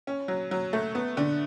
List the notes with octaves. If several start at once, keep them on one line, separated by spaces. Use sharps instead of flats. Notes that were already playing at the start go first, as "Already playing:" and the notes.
C#4
F#3
F#3
A3
B3
D3